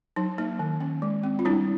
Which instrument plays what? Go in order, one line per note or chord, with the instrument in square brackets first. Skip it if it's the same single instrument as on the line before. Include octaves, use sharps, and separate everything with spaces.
[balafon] F#3 D#4
A#3 D#4
D#3
C#4
G#3
C4
F4
G3 D4 E4